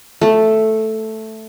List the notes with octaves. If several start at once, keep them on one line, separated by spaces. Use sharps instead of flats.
A3 A4